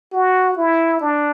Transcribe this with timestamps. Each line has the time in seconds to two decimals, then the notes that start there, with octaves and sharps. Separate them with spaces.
0.13 F#4
0.57 E4
1.01 D4